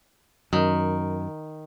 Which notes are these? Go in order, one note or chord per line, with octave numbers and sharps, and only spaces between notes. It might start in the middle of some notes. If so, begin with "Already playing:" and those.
F#2 D#3